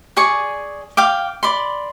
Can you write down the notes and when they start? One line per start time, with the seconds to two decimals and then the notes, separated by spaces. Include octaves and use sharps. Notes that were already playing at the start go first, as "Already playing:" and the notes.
0.17 G#4 D5 G#5 C#6
0.97 F5 G5 D6
1.43 D5 B5 C6